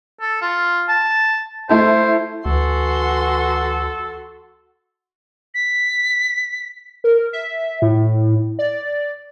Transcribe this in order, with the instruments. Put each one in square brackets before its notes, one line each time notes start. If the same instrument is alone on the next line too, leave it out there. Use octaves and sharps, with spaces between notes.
[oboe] A4
F4
A5
[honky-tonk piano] A3 E4 A5 [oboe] C5
[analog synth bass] D2 [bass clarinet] E3 [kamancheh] F#4 C6 [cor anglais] A4
[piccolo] B6
[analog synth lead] A#4
E5
A2
D5